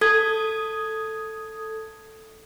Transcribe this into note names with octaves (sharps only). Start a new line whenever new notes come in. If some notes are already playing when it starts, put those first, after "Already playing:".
A4 D#6 G#6